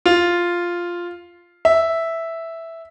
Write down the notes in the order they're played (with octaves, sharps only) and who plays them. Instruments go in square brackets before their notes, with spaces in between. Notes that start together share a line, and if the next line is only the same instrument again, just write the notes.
[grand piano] F4
E5